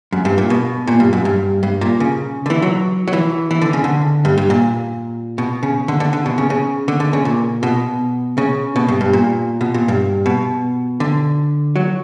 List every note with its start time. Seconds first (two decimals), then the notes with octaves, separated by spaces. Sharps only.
0.12 F#2
0.25 G2
0.38 A#2
0.50 B2
0.87 A#2
1.00 G2
1.13 F#2
1.25 G2
1.63 G2
1.81 A#2
2.00 C#3
2.46 D3
2.50 E3
2.62 F#3
3.08 F#3
3.13 E3
3.51 E3
3.61 D3
3.73 C#3
3.84 D3
4.25 G2
4.38 G2
4.50 A#2
5.38 B2
5.63 C#3
5.88 D3
6.00 D3
6.13 D3
6.26 B2
6.38 C#3
6.50 C#3
6.88 D3
7.00 D3
7.13 C#3
7.25 A#2
7.63 B2
8.38 C#3
8.76 B2
8.88 G2
9.01 G2
9.13 A#2
9.61 B2
9.74 A#2
9.88 G2
10.26 B2
11.00 D3
11.76 F#3